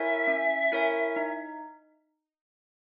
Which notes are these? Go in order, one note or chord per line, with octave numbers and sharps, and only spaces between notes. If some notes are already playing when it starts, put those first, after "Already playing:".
Already playing: E4 A#4 C#5 E5 G#5
C#4
E4 A#4 C#5 G#5
D#4